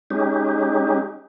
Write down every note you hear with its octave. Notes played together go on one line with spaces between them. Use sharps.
G#3 C#4 D#4 G4